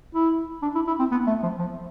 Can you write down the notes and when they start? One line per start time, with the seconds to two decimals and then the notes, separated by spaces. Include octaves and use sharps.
0.14 E4
0.62 D4
0.75 E4
0.87 E4
0.99 C4
1.11 B3
1.27 A3
1.43 F3
1.58 F3